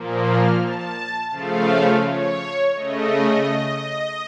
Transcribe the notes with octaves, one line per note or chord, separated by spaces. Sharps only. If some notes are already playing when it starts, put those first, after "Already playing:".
Already playing: A#2 F3 A#3
F6
A5
C#3 F3 A3 F5
C#5
C#3 A3 D#5